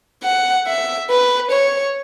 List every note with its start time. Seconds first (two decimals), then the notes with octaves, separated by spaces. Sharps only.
0.23 F#5
0.66 E5
1.10 B4
1.51 C#5